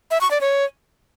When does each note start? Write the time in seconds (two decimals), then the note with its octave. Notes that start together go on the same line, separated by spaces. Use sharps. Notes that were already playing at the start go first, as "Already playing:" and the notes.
0.11 E5
0.21 C#6
0.31 D5
0.41 C#5